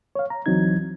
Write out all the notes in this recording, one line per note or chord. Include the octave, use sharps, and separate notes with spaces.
C#5 F5
A#5
D2 E3 F#3 C4 D#4 G#6